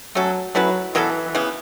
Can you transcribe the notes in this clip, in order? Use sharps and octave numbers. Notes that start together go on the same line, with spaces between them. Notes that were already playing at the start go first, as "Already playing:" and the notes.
F#3 A3 C#4 A4
F#3 A3 C#4 E4 B4
B2 E3 F#3 B3 A4
C#3 E3 B3